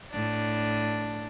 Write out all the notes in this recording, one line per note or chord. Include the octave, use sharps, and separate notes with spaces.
A2 D4